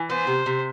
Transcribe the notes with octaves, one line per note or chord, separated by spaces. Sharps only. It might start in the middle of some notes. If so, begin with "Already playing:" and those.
Already playing: E3
B3 C5
C3
C3